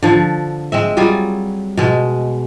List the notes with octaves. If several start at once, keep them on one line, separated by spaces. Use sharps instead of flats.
D3 F3
G#3 C4 E5
F#3 G3 F4 G#4
B2 G#3